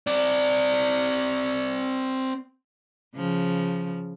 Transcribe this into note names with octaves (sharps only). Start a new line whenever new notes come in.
C4 D5
C#3 F3